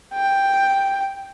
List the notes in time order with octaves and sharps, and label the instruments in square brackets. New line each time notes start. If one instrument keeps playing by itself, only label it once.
[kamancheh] G5